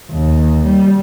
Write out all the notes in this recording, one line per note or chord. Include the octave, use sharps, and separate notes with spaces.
D#2
G3